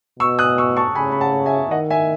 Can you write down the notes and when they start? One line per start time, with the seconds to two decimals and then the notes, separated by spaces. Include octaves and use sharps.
0.19 B2 C#6 E6
0.39 D#6 F#6
0.58 C#6 E6
0.77 A5 C#6
0.95 C#3 G#5 B5
1.12 B5
1.21 F#5 A5
1.46 E5 G#5
1.71 D#3 D#5 F#5
1.90 E5 G#5